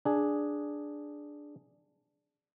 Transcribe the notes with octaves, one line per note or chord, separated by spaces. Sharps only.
D4 G#4